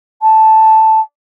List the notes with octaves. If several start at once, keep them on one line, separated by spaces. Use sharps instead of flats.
A5